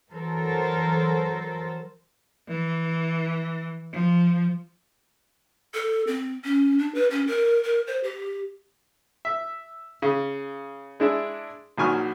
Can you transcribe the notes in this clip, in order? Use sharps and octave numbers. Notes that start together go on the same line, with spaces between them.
E3 F#3 A4 A#4 C5
E3
F3
A4
C4
C#4
D4
B4
C#4
A#4
A#4
C5
G4
E5
C#3
G#3 D4 E4
A#1 D#3 F#3 G#5 C#6 F6